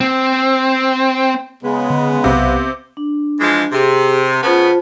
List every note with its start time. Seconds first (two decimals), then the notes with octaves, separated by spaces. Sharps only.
0.01 C4
1.63 C#3 G#3 B3
1.90 D3
2.24 B1 C3 F5
2.97 D4
3.41 E3 F3 G#3
3.72 C3 G4 G#4
4.42 C#3 B3 F4 C5 A5